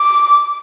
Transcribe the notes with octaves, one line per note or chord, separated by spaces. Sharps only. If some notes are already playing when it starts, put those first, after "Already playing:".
Already playing: D6